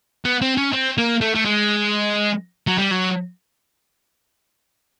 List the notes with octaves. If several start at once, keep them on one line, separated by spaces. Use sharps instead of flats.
B3
C4
C#4
C4
A#3
A3
A3
G#3
F#3
G3
F#3